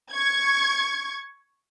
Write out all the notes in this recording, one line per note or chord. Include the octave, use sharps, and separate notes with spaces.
C#6 G#6